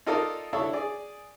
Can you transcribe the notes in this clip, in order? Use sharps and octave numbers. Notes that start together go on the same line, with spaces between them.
D#4 F4 A4 A#4 D5
D4 E4 A4 C#5 E5
G#4 D5